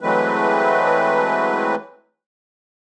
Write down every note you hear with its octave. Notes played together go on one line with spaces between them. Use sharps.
E3 F#3 G#3 A3 C4 B4